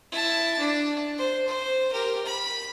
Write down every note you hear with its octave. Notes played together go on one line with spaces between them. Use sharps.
E4 A5
D4
C5
C5
G4 A#4
B5